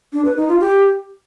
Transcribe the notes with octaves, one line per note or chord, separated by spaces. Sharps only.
D4
B4
D#4
F4
G4